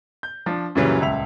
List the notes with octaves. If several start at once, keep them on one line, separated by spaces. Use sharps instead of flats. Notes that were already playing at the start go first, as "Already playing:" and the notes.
G6
F3 D4
F#2 A#2 C#3 E3 F#3 G3
D#1 C#2 E5 F7